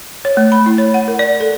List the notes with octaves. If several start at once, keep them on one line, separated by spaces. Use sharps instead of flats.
C#5
A3
B5
E4
C#5
F#5
A#4
D5
A4